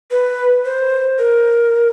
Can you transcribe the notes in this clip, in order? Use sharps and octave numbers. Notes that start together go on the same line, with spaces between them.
B4
C5
A#4